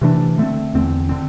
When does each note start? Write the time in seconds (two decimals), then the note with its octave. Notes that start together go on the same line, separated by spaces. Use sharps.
0.01 C3 E3 A3 D4
0.38 D3 A3 C4
0.74 E2 D3 C4
1.09 D3 C4